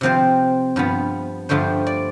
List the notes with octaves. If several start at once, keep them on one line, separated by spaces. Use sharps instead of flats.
C3 F3 C4 C5
G2 F3 B3
G2 D3 F3 A3 C5
D5